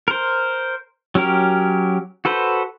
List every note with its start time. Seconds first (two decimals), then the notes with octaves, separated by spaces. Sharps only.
0.08 A#4 C5
1.15 F#3 C#4 G4 A#4
2.25 F#4 A4 B4 C5